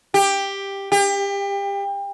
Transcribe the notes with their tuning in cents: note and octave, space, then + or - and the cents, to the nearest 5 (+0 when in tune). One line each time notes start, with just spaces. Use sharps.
G4 +10
G4 +30